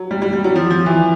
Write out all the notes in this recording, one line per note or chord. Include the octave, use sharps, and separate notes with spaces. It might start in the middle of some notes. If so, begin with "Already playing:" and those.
Already playing: F#3
G3
G3
G3
F#3
F3
F3
E3